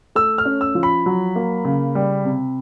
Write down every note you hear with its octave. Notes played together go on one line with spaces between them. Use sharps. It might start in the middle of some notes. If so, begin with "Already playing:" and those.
A3 E6
F6
C#4
E6
F3
B5
F#3
A#3
C#3
G3
C3